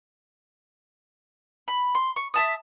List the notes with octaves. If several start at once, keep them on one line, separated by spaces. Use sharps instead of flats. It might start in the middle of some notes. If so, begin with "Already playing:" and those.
B5
C6
C#6
E5 A5 D#6